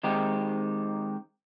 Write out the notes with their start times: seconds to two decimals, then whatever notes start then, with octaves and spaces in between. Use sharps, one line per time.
0.03 D#3 G#3 C4 D#4 G4